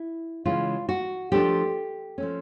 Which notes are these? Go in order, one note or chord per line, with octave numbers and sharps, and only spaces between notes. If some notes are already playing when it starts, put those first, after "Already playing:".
Already playing: E4
C#3 E3 G#3 C#4 F4
F#4
F3 A3 D4 G4
F3 A3 C#4